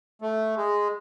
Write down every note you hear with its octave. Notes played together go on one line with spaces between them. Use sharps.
A3
G#3